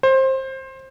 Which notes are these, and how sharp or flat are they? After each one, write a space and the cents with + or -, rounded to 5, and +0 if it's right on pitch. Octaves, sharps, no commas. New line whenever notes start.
C5 +20